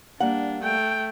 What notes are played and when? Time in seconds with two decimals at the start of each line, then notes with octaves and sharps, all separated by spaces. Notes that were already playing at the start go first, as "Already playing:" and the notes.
0.20 G3 A#3 D4 F#5
0.63 A3 G5